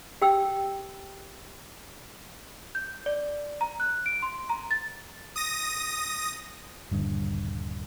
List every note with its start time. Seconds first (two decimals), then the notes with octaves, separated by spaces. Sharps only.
0.22 G4 G5 E6
2.75 G6
3.06 D5
3.61 A#5
3.80 F#6
4.06 D7
4.22 C6
4.50 A#5
4.71 A6
5.36 D#6 A#6
6.91 D#1 G2 D3